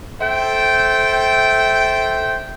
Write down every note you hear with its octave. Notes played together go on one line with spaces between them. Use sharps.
A4 C5 E5 G5